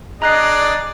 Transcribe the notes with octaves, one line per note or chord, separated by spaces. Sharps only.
D4 G#4 D5 D#5 A#5 F#6 C7